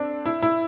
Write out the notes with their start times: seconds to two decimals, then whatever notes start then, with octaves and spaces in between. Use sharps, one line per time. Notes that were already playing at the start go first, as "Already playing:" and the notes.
Already playing: C4 D4 A4
0.26 E4
0.42 E4